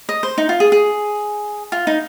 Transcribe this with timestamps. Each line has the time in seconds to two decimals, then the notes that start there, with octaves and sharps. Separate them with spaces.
0.09 D#5
0.23 C5
0.38 D#4
0.49 F4
0.60 G#4
0.72 G#4
1.72 F4
1.87 D#4